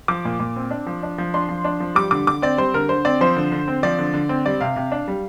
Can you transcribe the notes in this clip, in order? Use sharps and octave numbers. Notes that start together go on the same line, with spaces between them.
F3 D6
A#2
A#2
C4
D4
F3
D4
F3
D4 C6
F3
D4
F3
G3 D6
D3 D6
D3 D6
C4 D5
G3 C5
D3 A#4
D3 C5
C4 D5
F3 C5
D3
D3
C4
F3 D5
D3
D3
C4
G3 D5
C3 F5
C3
D4
G3